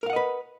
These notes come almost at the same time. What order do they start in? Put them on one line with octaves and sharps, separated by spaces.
A#4 F5 F#5 D#5 B4